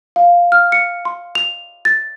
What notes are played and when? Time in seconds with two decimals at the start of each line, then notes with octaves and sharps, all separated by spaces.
0.16 F5
0.52 F6
0.72 C#7
1.05 C6
1.35 F7
1.85 A6